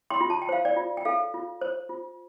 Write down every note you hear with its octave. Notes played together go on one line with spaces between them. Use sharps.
G5 C6
F4
A5
G5
C5 F5
D5 G5
F4
G5
A4 F5
F4
C5
F4